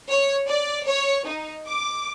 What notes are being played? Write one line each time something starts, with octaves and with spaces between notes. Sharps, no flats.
C#5
D5
C#5
D#4
D6